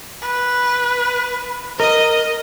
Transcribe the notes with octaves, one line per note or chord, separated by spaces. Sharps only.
B4
A#4 D#5